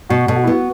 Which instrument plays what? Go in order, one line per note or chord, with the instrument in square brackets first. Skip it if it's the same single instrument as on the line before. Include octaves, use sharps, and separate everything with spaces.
[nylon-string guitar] B2 [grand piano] F#4
[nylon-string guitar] B2 [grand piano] A4
[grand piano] F#4
E4
[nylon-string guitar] B3 [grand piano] F#4